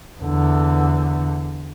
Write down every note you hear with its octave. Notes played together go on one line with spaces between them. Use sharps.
E2 D3